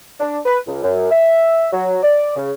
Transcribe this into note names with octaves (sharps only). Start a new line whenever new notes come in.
D4
B4
C#2
F#2
E5
F#3
D5
C#3